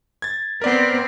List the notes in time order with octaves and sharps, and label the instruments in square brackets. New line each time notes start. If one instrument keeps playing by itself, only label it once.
[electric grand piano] G#6 A6
[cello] B3 C4 [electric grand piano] A#4 D5 F#5